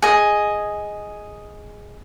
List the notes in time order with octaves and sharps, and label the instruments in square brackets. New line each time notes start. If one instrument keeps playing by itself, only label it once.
[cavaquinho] G#4 D#5